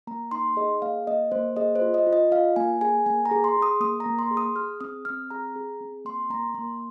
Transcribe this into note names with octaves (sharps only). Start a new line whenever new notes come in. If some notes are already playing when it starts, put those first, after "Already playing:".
A#3 A#5
D#4 C6
G#4 D#5
A#3 F5
A#3 D#5
A#3 C5
G#4 D#5
C5
F4
D#5
F4
D#5
F4 F5
A#3 G#5
G#4 G#5
A#3 G#5
A#5
G#4
C6
G#4
D#6
A#3 D#6
A#5
A#3
C6
G#4
D#6
G#4 F6
C4 D#6
C4 F6
G#4 A#5
G#4
C4
A#3 C6
A#3 A#5
A#3 C6